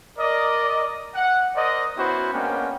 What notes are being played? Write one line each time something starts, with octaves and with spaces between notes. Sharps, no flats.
A#4 D5 D#5
F#5
A#4 C5 D5 D#5
B3 C#4 E4 F#4 B4 C5
G#3 A#3 B3 C#4 D4 G5